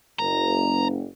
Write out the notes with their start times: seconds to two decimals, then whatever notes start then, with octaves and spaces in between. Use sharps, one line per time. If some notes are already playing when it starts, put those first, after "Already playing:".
0.19 F#1 A#5